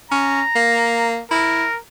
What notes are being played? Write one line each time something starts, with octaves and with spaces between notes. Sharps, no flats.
C#4 A#5
A#3
E4 A#4